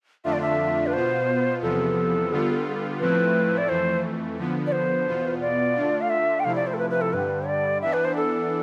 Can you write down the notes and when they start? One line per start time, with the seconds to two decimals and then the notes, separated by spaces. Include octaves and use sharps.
0.24 F2 D3 A3 D4 F4 E5
0.33 D5
0.41 E5
0.87 B4
0.93 B2 B3 F4 C5
1.62 E2 C3 F3 B3 A4
2.31 D3 G3 B3 F4
3.00 A2 F3 A3 C4 E4 B4
3.58 D5
3.68 F2 E3 A3 C5
4.38 D3 F3 B3
4.67 D5
4.72 C5
5.06 E2 B2 B3 F4
5.41 D5
5.75 D3 A3 D4 F4
6.01 F5
6.10 E5
6.40 G5
6.44 C3 F3 A3 E4 F5
6.56 D5
6.67 C5
6.74 A4
6.78 B4
6.90 B4
7.01 A4
7.12 G2 D3 G3 B4
7.47 D5
7.82 E3 B3 D4 E5
7.93 B4
8.05 C5
8.16 A4